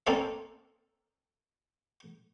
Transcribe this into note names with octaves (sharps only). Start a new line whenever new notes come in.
A#3 C4 C#4 A4 D5 F5